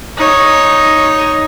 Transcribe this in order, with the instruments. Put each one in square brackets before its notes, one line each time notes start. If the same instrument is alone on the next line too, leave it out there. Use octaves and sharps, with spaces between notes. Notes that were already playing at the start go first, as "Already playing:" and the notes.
[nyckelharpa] D#4 C#5